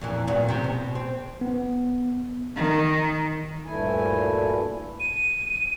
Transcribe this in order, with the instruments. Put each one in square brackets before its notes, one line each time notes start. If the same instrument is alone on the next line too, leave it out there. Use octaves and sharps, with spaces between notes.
[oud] F2 A#2 E3
E2 A#2 F#3
C3
B2
C4
[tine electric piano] B3
[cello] D#3
[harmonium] D2 G2 A#2 A3 E4 G#5
[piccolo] D#7